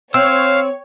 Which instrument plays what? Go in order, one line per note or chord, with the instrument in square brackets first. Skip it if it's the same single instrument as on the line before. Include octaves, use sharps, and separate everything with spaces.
[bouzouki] C4 [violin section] C#5 [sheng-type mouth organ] F5 [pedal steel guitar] E6